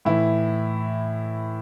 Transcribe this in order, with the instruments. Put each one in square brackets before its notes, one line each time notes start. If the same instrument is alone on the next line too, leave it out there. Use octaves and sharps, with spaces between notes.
[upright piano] A2 E3 E4